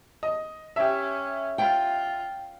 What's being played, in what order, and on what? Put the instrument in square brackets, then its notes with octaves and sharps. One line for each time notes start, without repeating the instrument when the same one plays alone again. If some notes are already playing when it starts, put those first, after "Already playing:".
[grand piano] D#5
[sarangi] C#4 [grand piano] G4 E5
[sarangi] F4 [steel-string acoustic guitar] G5